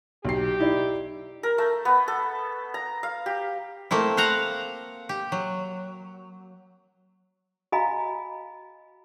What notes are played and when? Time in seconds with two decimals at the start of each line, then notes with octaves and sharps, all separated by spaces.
0.25 B1 G4 C7
0.60 D#4 E4 D5
1.43 A#4
1.58 A3
1.85 B3
2.08 A4
2.74 A#5
3.03 F5
3.26 G4
3.91 A3 A#3 C4 E4
4.17 C5 F5 F#5 A#5
5.09 G4
5.32 F#3
7.72 F#4 D#5 F5 G#5 A#5 B5